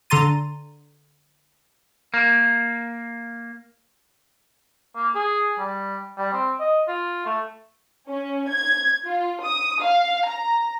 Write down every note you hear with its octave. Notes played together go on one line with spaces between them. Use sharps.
D3 A4 A#5 C6 A6 D#7
A#3
A#3
G#4
G3
G3
C4
D#5
F4
A3
C#4
G#6
F4
D#6
F5
A#5